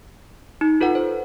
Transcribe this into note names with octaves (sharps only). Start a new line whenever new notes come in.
D#4
F4 A4 B4 F#5
C5